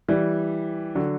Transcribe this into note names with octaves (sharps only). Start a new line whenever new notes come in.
E3 G3
D3 F#3